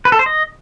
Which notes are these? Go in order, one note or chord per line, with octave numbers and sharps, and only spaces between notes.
B4
A4
C5
D#5